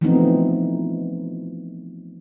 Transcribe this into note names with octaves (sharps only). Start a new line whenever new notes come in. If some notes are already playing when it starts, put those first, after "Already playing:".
E3 F3 A3 B3 C4 D#4